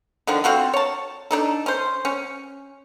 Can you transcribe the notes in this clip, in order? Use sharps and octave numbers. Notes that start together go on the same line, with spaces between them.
D3 D#3 F3 D4
C4 F4 F#4 A4
C#5 A5
D4 D#4 A4
C#4 C5
C#4